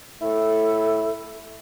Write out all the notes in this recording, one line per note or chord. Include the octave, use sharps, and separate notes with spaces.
A2 E4 A4